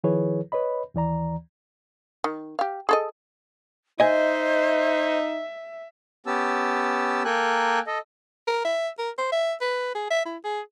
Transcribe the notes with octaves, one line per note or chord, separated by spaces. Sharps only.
D#3 F3 E4 G#4 B4 C#5
B4 C#5 D#5 B5
D#2 E3 D5 A#5
D#3
G4 F5
G#4 A4 D#5
D#4 C5 D#5 E5 G#5
B3 C#4 G4 A5 E6
A#3 A4 A#4 G5 G#5 F#6
A4 D#5
A#4
E5
A#4
C5
E5
B4
G#4
E5
E4
G#4